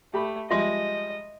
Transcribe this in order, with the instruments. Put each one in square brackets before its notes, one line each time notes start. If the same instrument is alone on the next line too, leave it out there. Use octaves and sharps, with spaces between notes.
[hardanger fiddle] A3 [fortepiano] G4 B5
[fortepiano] F3 G3 G#3 [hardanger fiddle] D#5 [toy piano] E5 C6 D#6